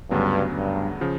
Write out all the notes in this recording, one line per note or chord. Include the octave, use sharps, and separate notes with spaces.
D2 G2 C#3 F#3 B3 D4
G2
C#3 F3